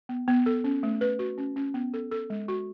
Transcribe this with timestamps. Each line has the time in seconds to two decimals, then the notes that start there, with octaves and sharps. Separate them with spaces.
0.09 B3
0.28 B3
0.46 A4
0.64 C#4
0.83 A3
1.01 B4
1.19 F#4
1.38 C#4
1.56 C#4
1.74 B3
1.94 A4
2.11 A4
2.30 G#3
2.48 F#4